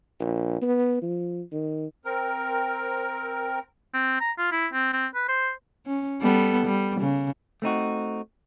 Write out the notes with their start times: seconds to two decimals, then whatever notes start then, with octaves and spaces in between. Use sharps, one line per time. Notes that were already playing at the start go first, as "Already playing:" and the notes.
0.20 A#1
0.62 B3
1.02 F3
1.52 D#3
2.05 C4 A#4
3.94 C4
4.20 A#5
4.38 F4
4.52 E4
4.73 C4
4.93 C4
5.15 B4
5.28 C5
5.86 C#4
6.22 G3 B3 A4
6.66 G3
7.01 C#3
7.62 A3 C4 D#4 F#4